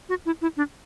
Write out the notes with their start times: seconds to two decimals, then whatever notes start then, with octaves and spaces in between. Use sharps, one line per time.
0.09 F#4
0.26 E4
0.42 E4
0.57 D4